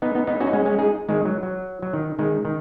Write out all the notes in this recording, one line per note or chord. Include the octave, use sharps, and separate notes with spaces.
B3 D#4
B3 D#4
B3 D#4
C#4 F#4
D#4
G#3 C#4
G#3 C#4
D#4 G#4
D#3 G#3
F#3
F#3
F#3
D#3
D#3 G#3
D#3